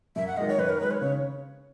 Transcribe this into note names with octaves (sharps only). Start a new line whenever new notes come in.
F#2 E5
F#5
D#3 G#3 D#5
C#5
F#2 B4
A#4
D#3 G#3 B4
C#5
C#3 C#5